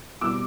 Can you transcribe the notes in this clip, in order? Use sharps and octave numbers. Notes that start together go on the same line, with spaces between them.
B2 G3 C4 D6 E6